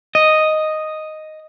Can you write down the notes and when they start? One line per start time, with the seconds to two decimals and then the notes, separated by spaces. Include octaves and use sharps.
0.15 D#5